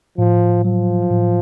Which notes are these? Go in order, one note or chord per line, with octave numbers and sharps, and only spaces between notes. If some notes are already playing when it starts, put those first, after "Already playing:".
A2 F3
F3 F#3
A2